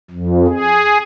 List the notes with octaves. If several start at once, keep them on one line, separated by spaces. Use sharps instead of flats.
F2
G#4